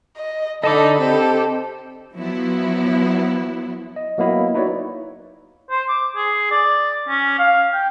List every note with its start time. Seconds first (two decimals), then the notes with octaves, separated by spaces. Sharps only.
0.17 D#5
0.64 D3 D#4 A4 D#5 A5 B5 D6
0.99 C4 G4 A4
2.16 F3 F#3 B3 E4
3.96 D#5
4.18 F#3 A#3 B3 E4 D#5 F5
4.54 D#4 E4 F#4 B4 C#5 D5
5.70 C5
5.89 D6
6.16 G#4
6.51 D5
7.08 C#4
7.38 F5
7.74 G5